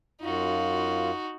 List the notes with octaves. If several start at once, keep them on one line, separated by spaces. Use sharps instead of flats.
F#2 D#4 F4 F#4